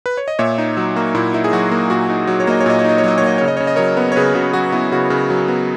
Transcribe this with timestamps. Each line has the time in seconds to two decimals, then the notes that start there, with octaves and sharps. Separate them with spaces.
0.06 B4
0.17 C#5
0.28 D#5
0.39 A#2 C#5 E5
0.58 D#4
0.77 F#3
0.96 A#3 F#4
1.15 A#2 E4
1.34 D#4 E4
1.44 G#4
1.53 F#3 F#4
1.71 A#3
1.90 A#2 F#4
2.10 D#4
2.27 F#3
2.40 C#5
2.47 A#3 D#5
2.60 C#5
2.66 A#2 D#5
2.79 C#5
2.84 D#4 D#5
2.98 C#5
3.04 F#3 D#5
3.18 A#3 C#5
3.27 D#5
3.38 C#3 C#5
3.48 D#5
3.57 C#3 C#5
3.67 D#5
3.76 F#3 A#4 C#5
3.97 B3
4.12 C#5
4.16 C#3 G#4 B4
4.35 C#3 F#4
4.53 F#3 F#4
4.72 B3 E4
4.92 C#3 F#4
5.10 C#3
5.30 F#3
5.48 B3